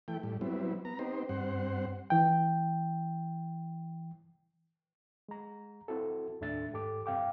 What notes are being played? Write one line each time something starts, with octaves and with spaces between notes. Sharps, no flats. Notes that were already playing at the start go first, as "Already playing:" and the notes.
E3 A3 G5
A2 G3
F#3 G3 B3 C4 E4
B3 A#5
B3 C4 D#4 G4 C5
G2 C4 C5 F#5
E3 G5
G#3 A#5
C4 E4 F#4 A4
D#2 A2 A3 D4 E5 A6
G#2 G4 A4 D6
G2 C3 F5 G5 D6